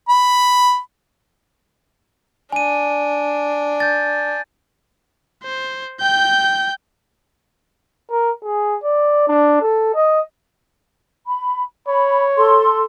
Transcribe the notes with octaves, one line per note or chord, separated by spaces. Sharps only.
B5
D4 G#5 D#7
G6 A6
C5
G5 G6
A#4
G#4
D5
D4
A4
D#5
B5
C#5 B5
A4 C6